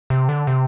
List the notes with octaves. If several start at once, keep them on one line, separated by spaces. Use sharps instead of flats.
C3
D3
C3